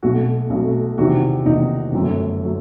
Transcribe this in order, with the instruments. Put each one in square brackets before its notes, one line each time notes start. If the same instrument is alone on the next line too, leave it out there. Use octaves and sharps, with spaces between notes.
[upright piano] B1 B2 F#3 A3 F#4
B1 B2 F#3 A3
E2 C3 D#3 F#4
E2 C3 D#3 D#4
G1 F#2 F#3 A3
F#3 A3